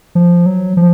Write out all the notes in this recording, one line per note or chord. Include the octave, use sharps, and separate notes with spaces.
F3
F#3
F3